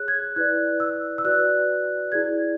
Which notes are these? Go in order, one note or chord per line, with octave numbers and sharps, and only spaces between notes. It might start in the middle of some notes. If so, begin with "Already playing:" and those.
Already playing: G#4 C#5 F#6
G#6
E4 B4 D5 F#6
E6
E6
F#4 B4 D5 F#6
E4 G#4 D5 G#6